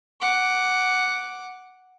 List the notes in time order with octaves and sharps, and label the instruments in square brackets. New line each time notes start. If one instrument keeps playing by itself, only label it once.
[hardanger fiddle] F#5 D6